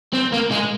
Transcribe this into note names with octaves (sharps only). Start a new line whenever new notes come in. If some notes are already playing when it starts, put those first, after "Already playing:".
C4
A#3
G#3